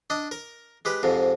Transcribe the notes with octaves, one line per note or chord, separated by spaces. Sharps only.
D4 D#5
A#4
G#3 G4 B4
F2 G#2 C3